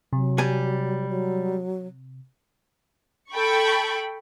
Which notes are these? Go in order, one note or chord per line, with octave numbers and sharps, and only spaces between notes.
C3 F#3
G3 G#5
F#3
A4 G5 B5 C#6